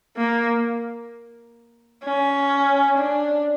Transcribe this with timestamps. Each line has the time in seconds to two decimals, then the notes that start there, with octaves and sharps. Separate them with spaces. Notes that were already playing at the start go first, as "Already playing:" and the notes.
0.17 A#3
2.05 C#4
2.98 D4